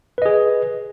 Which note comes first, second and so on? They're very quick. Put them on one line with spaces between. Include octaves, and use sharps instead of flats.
B4 D#5 G#4